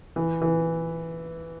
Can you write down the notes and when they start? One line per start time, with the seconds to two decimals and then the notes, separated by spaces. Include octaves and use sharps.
0.16 E3
0.42 E3